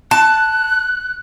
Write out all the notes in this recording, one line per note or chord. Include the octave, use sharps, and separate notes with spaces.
A5 F#6